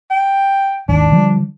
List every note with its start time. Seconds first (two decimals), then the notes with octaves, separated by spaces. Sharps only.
0.11 G5
0.89 G#1 D#2 D4
1.12 D3 F3 G3